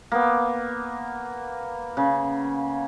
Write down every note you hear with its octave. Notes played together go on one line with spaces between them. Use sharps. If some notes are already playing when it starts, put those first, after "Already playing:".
A#3 B3
C#3